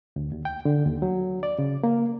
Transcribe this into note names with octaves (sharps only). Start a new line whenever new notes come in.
D2
D#2
G5
D3
D#2
F#3
D5
C#3
A#3